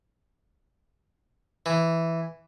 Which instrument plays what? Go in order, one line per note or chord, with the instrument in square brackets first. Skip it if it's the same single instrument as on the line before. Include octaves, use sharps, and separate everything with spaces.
[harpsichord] E3